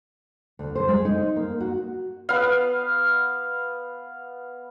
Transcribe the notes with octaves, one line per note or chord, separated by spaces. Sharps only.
D2
C5
G#3
D#4
A#3
F#4
B3 F5